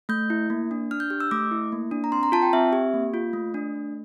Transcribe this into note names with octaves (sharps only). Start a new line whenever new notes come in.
A3 G6
E4
A#3
D4
D4 F6
G6
G4 G6
E6
A3 D6
E4
A#3
D4
A#5
C4 C6
A#5
F4 A5
G5
C4 E5
G4
A#3
F4
A3
D4
A3